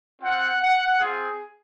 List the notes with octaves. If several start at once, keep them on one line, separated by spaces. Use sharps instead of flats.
C4 F4 F#5
F#5
C4 F4 G#4